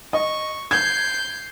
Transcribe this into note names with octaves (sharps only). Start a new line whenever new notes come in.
D#5 C#6
G6 G#6 C7